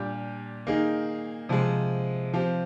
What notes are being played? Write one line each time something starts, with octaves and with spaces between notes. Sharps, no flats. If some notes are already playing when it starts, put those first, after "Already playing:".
Already playing: A#2 G3 D4 G4
D#3 A#3 D#4 G#4
C3 F3 G#3
F3 C4 G4